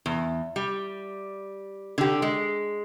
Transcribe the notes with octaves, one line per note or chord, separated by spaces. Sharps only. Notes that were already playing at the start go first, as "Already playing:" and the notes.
E2
G3
D3 G4
G#3